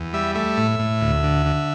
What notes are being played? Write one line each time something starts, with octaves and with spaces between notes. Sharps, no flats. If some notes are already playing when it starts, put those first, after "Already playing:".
Already playing: E2
G3 E5
A3 E5
A2
A2
D2
D3
D3